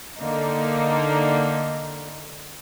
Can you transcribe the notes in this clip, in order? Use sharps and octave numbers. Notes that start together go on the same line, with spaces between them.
D3 A#3 D#4